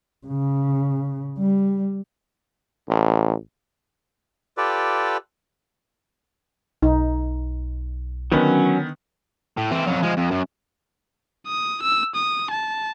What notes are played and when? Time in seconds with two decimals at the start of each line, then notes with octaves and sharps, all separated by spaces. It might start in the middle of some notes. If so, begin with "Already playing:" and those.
0.27 C#3
1.39 G3
2.89 A1
4.57 F4 G4 A4 B4 D5
6.82 B1 D#4
8.32 D3 D#3 F#3 B3 C#4
9.57 A2
9.71 E3 C4
9.86 F2 F#3
10.03 F3 G#3
10.17 F2
10.31 F#2
11.47 D#6
11.83 E6
12.15 D#6
12.51 A5